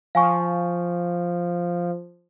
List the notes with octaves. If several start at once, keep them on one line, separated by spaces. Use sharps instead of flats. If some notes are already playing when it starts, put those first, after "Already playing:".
F3 F5 G#5 C#6